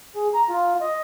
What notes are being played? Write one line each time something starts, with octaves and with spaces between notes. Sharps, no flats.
G#4
A#5
F4
D#5